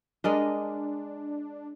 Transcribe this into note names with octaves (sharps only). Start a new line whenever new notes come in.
G#3 D4 A#4 D#5